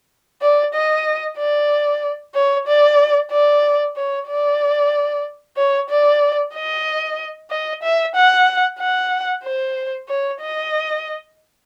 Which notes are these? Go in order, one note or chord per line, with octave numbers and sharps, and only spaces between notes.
D5
D#5
D5
C#5
D5
D5
C#5
D5
C#5
D5
D#5
D#5
E5
F#5
F#5
C5
C#5
D#5